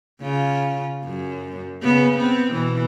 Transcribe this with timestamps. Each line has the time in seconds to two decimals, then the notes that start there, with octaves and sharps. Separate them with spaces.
0.21 C#3 F4
1.03 F#2
1.83 C#3 B3
2.17 B3 C4
2.52 B2 E3